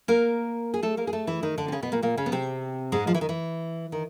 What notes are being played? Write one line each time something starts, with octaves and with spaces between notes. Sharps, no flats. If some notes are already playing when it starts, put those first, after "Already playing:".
A#3 A#4
G#4
A3 A4
A#3 A#4
G#4
A3 A4
E3 E4
D#3 D#4
D3 D4
C4
C#3 C#4
B2 B3
A#2 A#3
A#2 A#3
C#3 C#4
B3
C3 C4
G#2 G#3
F3
E3
D#3
E3
D#3